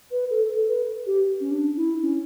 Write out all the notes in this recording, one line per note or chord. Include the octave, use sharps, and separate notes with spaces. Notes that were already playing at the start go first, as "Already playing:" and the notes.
B4
A4
A4
B4
G4
C#4
D4
E4
C#4